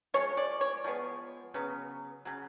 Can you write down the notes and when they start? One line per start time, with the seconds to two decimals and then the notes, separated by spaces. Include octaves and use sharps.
0.14 F3 G#3 C#5
0.37 D5
0.61 C#5
0.84 F3 G#3 B3
1.54 C#3 F#3 B3
2.25 C#3 F#3